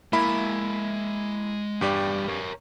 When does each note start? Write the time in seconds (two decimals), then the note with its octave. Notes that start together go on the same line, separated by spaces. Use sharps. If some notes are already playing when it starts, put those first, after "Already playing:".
0.13 G#3 A#3 E4 E5 B5
1.81 E2 G2 G3 G4 D5
2.28 A#4 C#5